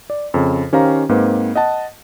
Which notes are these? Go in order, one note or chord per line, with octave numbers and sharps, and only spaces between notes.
D5
F2 C#3
D#3 C#4 G4 C5 F5 A#5
G#2 A#3 C4 B4
D#5 F#5 A5